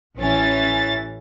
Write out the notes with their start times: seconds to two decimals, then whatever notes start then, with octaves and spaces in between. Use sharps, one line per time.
0.17 A1 E3 C#4 A6